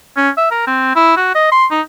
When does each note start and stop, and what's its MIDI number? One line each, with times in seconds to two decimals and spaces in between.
0.17 0.30 61
0.37 0.49 76
0.51 0.64 70
0.67 0.92 60
0.95 1.16 64
1.16 1.31 66
1.35 1.50 75
1.51 1.66 84
1.71 1.81 63